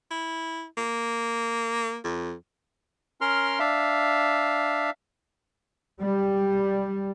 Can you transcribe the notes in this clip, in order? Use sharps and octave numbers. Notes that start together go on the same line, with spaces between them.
E4
A#3
F2
C#4 A#4 C6 F6
D4 E5 F5
G3